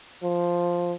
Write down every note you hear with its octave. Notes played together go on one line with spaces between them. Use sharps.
F3